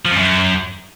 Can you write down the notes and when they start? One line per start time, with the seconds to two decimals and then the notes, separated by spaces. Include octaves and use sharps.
0.05 F3
0.11 F2
0.17 F#2